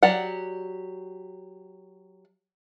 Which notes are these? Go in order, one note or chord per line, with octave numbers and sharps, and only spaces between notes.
F#3 G4 D5 F#5